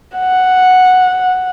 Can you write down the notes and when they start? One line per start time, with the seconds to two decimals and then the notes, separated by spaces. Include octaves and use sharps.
0.16 F#5